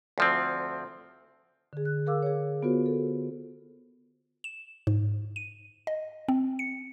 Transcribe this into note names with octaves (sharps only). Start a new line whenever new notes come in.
D2 F3 C4
D3 G#4
F#6
G#4 A#4 F5 D6 E6
G#4 C#5
B3 F4 F#4 A#4 C5
A4
E7
G#2
D#7
D#5
C4
C#7